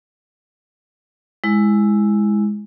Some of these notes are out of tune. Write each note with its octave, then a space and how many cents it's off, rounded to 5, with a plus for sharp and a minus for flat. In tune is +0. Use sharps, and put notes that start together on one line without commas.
G#3 +0 E4 +0